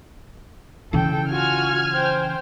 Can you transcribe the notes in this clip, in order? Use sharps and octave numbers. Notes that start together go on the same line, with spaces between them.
C#3 E3 A4 G5
F4 F#4 G#5 F6 G#6
C5 G5